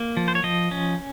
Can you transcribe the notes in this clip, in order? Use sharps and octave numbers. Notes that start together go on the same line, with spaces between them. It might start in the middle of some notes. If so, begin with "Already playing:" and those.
Already playing: A#3
F3
C5
C#5
F3 D#5
C#4